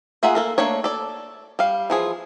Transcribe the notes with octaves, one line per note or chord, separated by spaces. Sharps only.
A#3 F4 G#4 E5 F#5
A#3 A4 A#4
A3 A#3 D4 C#5
A4 D5
G3 F5
E3 F3 G#4